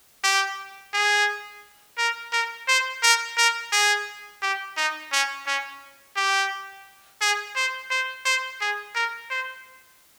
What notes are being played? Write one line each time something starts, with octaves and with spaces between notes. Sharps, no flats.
G4
G#4
A#4
A#4
C5
A#4
A#4
G#4
G4
D#4
C#4
C#4
G4
G#4
C5
C5
C5
G#4
A#4
C5